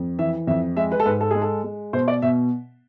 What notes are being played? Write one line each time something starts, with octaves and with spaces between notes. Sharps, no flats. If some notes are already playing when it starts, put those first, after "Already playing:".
Already playing: F2
E3 E5
F2 E5
G#3 E5
B4
A4
G#2 B4
A4
G#3 G#4
A4
G#3
B2 C5
D5
B2 E5